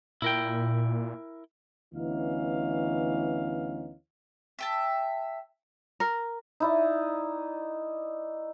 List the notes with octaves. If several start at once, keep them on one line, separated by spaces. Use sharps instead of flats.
A#2 E4 A#4 G5
D2 E3 B3 C#4 D#4 F5
E5 G5 A5
A#4
D#4 E4 D5